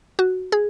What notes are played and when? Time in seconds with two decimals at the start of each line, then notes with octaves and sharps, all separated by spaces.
0.19 F#4
0.52 G#4